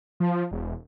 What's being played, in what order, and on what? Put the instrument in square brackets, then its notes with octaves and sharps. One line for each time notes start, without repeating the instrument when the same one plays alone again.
[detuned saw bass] F3
E1